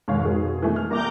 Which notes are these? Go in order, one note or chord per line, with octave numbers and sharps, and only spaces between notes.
F2 G#2 B2 D#3 C#5 F5
G#4
E3 A3
F6
C2 A#3 A#5 D6 G6